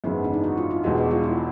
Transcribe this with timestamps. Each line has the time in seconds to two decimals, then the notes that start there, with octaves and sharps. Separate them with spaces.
0.04 G#1 F#2 C#3 E3 G#3 B3
0.24 D4
0.33 D#4
0.44 F#4
0.57 F4
0.71 F4
0.84 E1 E2 B2 G#3 G4
0.98 F#4
1.11 F4
1.23 E4